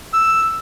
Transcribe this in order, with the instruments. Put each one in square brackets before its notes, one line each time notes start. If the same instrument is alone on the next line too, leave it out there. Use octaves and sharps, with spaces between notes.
[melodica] E6